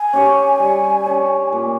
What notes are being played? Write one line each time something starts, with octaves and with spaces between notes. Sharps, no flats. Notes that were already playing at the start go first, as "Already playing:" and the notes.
Already playing: G#5
C#4 G4 C#5
G3
C#4 G4 C#5
A#2